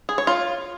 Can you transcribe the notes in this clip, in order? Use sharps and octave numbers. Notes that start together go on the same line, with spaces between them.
G#4
C#5
F4